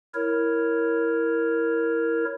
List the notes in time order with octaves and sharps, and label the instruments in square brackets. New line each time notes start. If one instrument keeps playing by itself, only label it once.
[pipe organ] E4 A#4 C#5